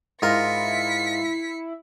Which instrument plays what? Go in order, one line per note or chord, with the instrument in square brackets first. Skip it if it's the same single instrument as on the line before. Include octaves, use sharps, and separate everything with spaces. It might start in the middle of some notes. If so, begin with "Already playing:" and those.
[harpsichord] G#2 F4 A#4 [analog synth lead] E4 [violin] B6 C#7